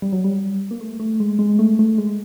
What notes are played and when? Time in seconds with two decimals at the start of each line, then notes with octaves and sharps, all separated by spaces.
0.02 G3
0.12 F#3
0.24 G3
0.71 A#3
0.81 A3
1.00 A3
1.20 G#3
1.39 G#3
1.59 A3
1.79 A3
1.98 G#3